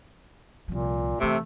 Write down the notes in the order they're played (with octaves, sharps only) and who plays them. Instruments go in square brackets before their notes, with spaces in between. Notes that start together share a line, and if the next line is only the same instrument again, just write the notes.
[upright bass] C2 F3 [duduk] A#2
[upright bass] A#1 E3 [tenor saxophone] C3 [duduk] A3